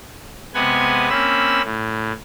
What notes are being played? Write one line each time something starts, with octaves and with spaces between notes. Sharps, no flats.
C3 G#3 B3 B4 F#5 G#5
A#3 C4 C#4 B5 E6
A2